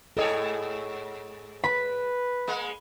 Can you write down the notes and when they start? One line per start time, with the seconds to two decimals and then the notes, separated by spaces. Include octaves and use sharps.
0.17 G#2 G#4 A4 C#5 D#5
1.64 B4 B5
2.47 G#3 A#3